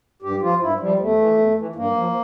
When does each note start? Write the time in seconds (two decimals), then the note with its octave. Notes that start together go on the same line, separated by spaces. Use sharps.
0.22 G2 G4
0.41 F3 F4
0.60 G2 E4
0.80 F3 G3
0.99 E2 A3
1.19 E3
1.38 E2
1.57 E3
1.75 G2 A#3
1.95 F3